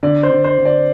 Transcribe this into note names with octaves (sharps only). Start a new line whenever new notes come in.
D3 D5
C5
D3
C5
D3
D5